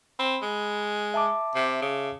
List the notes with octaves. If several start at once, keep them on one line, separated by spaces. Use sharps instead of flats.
C4 B5
G#3
E5 A5 D6
C3
C#3